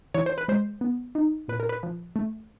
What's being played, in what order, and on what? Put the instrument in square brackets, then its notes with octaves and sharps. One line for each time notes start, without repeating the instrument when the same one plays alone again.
[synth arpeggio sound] E3 C#5
C5
B4
G#3 C5
B3
D#4
A#2 B4
A#4
B4
F3
A3